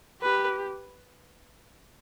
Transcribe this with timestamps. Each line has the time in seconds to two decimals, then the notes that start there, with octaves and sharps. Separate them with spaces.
0.22 G4 B4